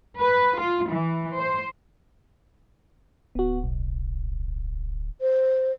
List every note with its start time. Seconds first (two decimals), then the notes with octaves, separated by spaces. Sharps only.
0.19 B4
0.58 F4
0.89 E3
1.37 C5
3.35 D1 B3 F#4
3.64 B1
5.21 C5